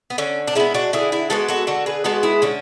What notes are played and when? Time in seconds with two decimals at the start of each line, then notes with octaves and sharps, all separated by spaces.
0.10 B3
0.18 D3 C#4
0.48 D4
0.55 G#3 B3 C#4 E4
0.74 D4 F#4
0.93 D3 E4 G#4
1.12 E4 G#4
1.30 G#3 B3 F#4 A4
1.48 F#4 A4
1.67 D3 F#4 A4
1.86 G#4 B4
2.04 G#3 B3 F#4 A4
2.23 E4 G#4
2.42 D3 C#4